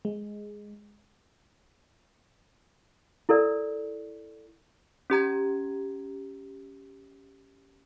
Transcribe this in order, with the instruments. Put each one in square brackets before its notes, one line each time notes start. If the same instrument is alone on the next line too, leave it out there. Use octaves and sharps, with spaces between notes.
[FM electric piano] G#3
[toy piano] E4 A4 A#4 D5
[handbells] C#4 G4 A#5 G#6